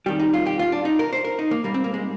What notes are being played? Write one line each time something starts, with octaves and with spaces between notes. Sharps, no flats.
F2 D#3 G3 G4
D#4
F4
G4
F4
D4
D#4
A#4
C5
A#4
D#4
A#3
G#2 G3 A#3
C4
A#3
G#3